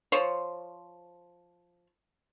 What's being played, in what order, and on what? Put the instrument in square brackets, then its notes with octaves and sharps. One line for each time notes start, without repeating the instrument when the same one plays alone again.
[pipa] F3 C5 C#5